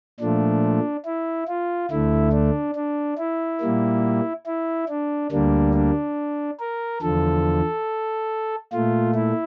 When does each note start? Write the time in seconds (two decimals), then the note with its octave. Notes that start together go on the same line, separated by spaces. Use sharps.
0.20 A#2 F3 A3 D4
1.06 E4
1.48 F4
1.91 D2 D3 A3 E4
2.33 D4
2.76 D4
3.18 E4
3.61 A#2 G3 A#3
4.47 E4
4.89 D4
5.31 D2 D3 G3 A#3 D4
5.74 D4
6.60 A#4
7.02 E2 D3 F3 A4
8.72 A#2 A3 F4
9.15 E4